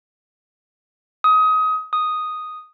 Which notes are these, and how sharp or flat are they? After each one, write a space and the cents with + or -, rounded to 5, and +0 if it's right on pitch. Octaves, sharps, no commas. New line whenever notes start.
D#6 +25
D#6 +0